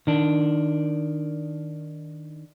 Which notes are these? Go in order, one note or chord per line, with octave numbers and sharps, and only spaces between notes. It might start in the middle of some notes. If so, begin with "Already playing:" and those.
D#3 D4